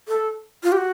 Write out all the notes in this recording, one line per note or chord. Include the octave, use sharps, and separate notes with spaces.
A4
F4
G4
F#4